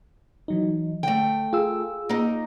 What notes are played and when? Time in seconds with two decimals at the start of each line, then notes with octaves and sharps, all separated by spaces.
0.48 E3 F#3 D#4
1.03 D3 A3 G5
1.53 F4 G#4 E6
2.09 A#3 D#4